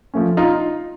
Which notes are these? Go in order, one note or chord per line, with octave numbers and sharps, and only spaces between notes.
F3 A3 C#4
D#4 F4